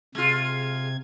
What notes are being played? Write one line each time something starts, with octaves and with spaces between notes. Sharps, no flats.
C3 G#3 F4 G#6